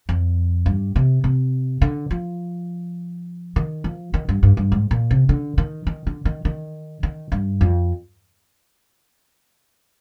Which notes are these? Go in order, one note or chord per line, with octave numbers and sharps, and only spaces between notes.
F2
G2
C3
C3
D3
F3
D#3
F3
D#3
G2
G2
G2
G#2
A#2
C3
D3
D#3
D#3
D3
D#3
D#3
D#3
G2
F2